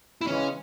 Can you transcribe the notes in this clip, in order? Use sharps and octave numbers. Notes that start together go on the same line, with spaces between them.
E4
C#3 E3 G#3 C#4